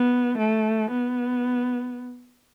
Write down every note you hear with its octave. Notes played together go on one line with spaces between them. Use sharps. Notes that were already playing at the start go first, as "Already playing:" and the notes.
Already playing: B3
A3
B3